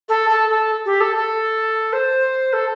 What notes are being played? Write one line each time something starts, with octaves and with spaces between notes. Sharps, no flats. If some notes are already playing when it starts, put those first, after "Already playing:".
A4
A4
A4
G4
A4
A4
C5
A4